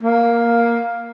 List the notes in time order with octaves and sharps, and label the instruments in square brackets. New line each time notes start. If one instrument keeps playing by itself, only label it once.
[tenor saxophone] A#3